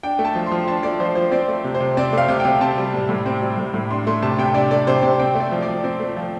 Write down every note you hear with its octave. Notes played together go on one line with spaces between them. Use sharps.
D4 G5
A3
A5
F3
C6
F3
D4 A5
A3 D5
F3 C5
F3 C5
C4 D5
A3
C3
C5
C3
C4 D5
A3 F5
C3
G5
C3
C4 A5
G3
A2
A2
C4
G3
A2
A2
D4 C6
A3 C6
C3 A5
C3 G5
D4 D5
A3 D5
C3 C5
C3 D5
C4 G5
A3
D5
F3
D5
F3
C4 D5
A3
F3